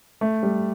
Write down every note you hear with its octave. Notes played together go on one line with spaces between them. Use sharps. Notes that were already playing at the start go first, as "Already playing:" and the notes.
A3
G3